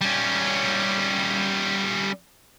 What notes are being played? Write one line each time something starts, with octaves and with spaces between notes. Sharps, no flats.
G3 C#4